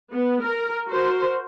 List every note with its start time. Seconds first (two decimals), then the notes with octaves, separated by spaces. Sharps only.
0.13 B3
0.43 A#4
0.87 F#4 A#4 C5